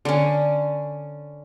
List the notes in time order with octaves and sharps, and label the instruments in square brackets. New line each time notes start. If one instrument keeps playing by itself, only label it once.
[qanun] D3 C#4